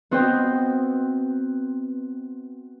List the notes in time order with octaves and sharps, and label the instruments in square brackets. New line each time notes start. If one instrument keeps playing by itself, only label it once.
[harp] B3 C4 F#4 C5 D#5 G5